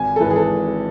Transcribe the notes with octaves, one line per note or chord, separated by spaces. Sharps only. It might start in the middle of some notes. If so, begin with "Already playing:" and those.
Already playing: G#1 G#5
A4
G#2 E3 G#3 B4
G#4
A4
G#1